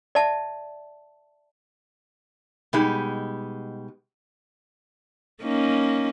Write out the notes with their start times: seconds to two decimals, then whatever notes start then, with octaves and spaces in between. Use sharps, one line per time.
0.15 D5 E5 A5
2.73 B2 G3 G#3 D#4 G4
5.43 A#3 C#4 D#4